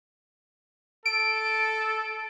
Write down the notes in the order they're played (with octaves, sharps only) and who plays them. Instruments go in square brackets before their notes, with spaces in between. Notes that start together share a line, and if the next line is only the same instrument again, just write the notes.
[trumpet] A4 [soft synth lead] D7